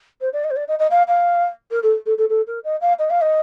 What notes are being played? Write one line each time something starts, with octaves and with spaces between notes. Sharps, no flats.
C5
D5
D#5
C5
D5
D#5
D#5
F5
F5
A#4
A4
A4
A4
A4
A#4
D#5
F5
D#5
F5
D#5